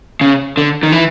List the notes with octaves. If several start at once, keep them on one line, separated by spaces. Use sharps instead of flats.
C#3
D3
D#3
E3